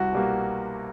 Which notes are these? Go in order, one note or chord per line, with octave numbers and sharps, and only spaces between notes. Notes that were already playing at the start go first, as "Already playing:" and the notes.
Already playing: C2 F#4
B2 G3 A#3